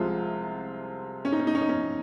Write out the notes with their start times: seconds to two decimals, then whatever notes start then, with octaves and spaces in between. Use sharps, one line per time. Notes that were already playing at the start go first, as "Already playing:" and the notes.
Already playing: C2 C3 F3 G#3 F4
1.25 C#4
1.32 D#4
1.39 C#4
1.47 D#4
1.55 C#4
1.62 D#4
1.69 C#4